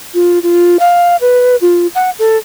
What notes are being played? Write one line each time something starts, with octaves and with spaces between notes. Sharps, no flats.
F4
F4
F5
B4
F4
F#5
A4